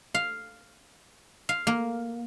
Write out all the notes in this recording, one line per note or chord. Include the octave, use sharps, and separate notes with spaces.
F5
F5
A#3